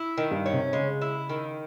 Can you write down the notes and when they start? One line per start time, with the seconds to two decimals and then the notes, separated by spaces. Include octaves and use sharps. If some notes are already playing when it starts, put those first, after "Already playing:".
Already playing: E4
0.18 D#3
0.31 G2
0.46 C#4
0.53 C3
0.73 C#3 G#3
1.01 E4
1.29 D#3